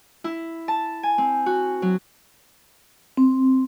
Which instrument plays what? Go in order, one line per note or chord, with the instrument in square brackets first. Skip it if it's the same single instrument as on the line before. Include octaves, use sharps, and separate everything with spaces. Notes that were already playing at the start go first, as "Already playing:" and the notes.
[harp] E4
A5
G#5
C4
F#4
F#3
[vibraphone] C4